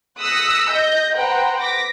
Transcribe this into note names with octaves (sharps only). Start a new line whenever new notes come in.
D#6 E6 F#6 A#6 B6 C#7
D#5 G6 A#6
B4 C5 F#5 G5 A#5
D6 A#6 B6